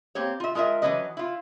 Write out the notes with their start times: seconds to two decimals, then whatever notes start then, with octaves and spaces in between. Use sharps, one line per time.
0.15 A#3 C4 G4 C#5
0.40 F4 E5
0.55 G#3 F4 A#4 D#5 E5
0.82 E3 F#3 G#3 C#4 B4 D#5
1.17 E4 F4